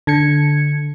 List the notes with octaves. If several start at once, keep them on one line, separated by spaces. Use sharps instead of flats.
D3 G#6 C#7